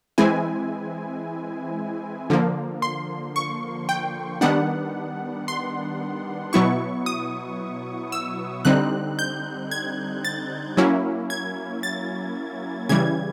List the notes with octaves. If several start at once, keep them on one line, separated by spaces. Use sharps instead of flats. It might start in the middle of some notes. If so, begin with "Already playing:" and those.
E3 G#3 C4 E4 G#5
D3 F3 A#3
C6
C#6
G5
D#3 G3 B3 D4 F#5
C6
B2 F#3 B3 E4 C#6
D#6
E6
D3 G3 C4 D#4 F#6
G6
G#6
A6
F#3 A#3 C#4 E4
G#6
A6
C#3 E3 G3 G#6